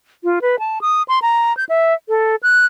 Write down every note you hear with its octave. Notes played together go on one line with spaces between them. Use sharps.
F4
B4
A5
D#6
C6
A#5
G6
E5
A4
F#6